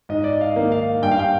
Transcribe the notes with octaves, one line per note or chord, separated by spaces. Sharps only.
G#2 D#5
D5
D#5
F5
D#3 A#3 D#4
F5
G2 G5
F5
G5